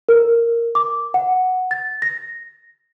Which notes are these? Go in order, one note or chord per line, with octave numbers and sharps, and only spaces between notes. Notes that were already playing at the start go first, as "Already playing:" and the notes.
A#4
D6
F#5
A6
A#6